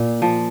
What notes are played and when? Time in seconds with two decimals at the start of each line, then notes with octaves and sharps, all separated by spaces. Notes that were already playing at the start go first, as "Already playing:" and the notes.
Already playing: A#2
0.22 F3